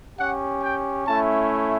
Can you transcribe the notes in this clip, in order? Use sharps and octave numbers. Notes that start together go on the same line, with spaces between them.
C#4 G4 F#5
G5
A3 C#4 E4 A5